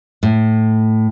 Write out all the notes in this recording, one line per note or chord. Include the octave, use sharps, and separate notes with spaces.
A2